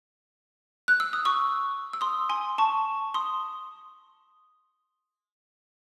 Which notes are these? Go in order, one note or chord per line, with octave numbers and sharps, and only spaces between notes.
F#6
E6
D#6
C#6 E6
E6
C6 D#6
G#5 C6
A5 C#6
C6 D#6